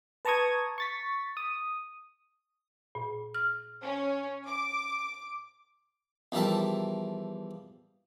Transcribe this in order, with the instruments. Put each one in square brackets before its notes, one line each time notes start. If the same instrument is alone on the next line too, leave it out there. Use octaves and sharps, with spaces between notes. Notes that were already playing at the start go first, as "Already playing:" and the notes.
[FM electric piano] B4 A5 A#5 C#6 D#6 G#6
C#6 A6 B6
D#6
[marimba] A#2
F6
[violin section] C#4
D6
[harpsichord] E2 F3 G3 A#4 E5 A5